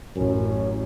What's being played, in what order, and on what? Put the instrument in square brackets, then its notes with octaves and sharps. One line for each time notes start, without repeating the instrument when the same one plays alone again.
[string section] A1 [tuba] F#2 [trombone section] C#4